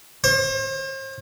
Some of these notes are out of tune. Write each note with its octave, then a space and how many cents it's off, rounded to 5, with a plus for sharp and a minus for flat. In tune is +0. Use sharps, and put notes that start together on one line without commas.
C5 +40